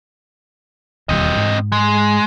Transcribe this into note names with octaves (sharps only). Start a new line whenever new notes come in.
E1 D#2 G3 C4 D#5
G#2
G#3